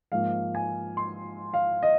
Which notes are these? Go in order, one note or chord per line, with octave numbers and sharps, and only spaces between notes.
G#2 F3 A#3 F5
G#5
C6
F5
D#5